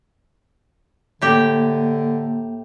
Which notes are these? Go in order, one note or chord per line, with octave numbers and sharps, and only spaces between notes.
A2 D3 A#3 G4 G5